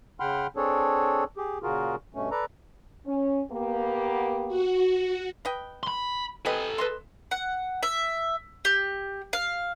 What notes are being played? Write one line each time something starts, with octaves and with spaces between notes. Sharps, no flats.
C#3 F#5 G5 B5 C6 F6
C4 D4 G#4 A4 C#5
G4 G#4
A#2 C#3 F4 F#4 G#4 A#4
G2 B2 A3 C#4
A4 B4 D5 A#5
C#4
A#3 B3 G4
F#4
B4 D#5 G5
B5 C6
C4 A4 B4 D#5 G#5
B4 D#5 C6
F#5
E5
G4
F5